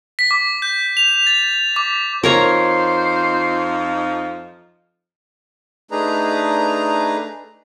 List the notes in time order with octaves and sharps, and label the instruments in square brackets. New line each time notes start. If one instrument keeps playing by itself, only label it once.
[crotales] B6
D6
G6
F7
A6
D6
[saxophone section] F2 F3 D#4 [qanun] A#4 C#5 A#5 [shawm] C5
[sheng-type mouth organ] A3 D4 D#4 G#4 B4 A#5